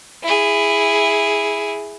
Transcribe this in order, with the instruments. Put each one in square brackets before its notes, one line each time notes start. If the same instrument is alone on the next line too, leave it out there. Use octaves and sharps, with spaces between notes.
[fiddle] E4 G#4